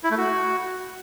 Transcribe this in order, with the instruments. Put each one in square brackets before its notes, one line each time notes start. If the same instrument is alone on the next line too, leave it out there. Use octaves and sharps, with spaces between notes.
[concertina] E4
A3
F#4